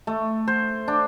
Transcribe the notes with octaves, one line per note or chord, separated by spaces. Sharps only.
A3
C5
D4